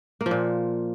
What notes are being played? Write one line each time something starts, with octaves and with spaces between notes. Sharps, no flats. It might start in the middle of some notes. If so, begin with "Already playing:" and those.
A#3
F3
A#2